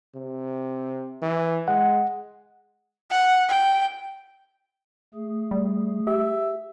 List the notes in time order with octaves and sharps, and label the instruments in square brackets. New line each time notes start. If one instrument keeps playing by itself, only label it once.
[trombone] C3
E3
[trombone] G#3 [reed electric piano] F#5
[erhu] F#5
G5
[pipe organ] A3 G#4
[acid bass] G3
[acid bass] G4 [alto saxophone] E5